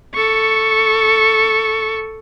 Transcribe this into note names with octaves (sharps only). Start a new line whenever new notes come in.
A4 C#6